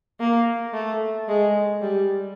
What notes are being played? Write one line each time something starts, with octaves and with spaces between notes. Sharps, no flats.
A#3
A3
G#3
G3